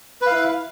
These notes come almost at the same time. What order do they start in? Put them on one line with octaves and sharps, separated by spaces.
B4 F5 E4